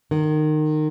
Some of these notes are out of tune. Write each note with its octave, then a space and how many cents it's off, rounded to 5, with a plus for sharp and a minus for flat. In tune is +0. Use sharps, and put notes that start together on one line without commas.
D#3 -25